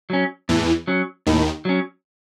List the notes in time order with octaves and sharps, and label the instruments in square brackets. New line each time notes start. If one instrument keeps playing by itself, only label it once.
[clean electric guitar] F#3 C#4
[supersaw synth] E2 E3 [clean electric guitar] A2
[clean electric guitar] F#3 C#4
[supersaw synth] D#2 D#3 [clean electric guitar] A2
[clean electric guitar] F#3 C#4